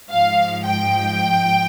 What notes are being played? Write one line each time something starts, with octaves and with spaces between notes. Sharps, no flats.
G#2 F3 F5
G5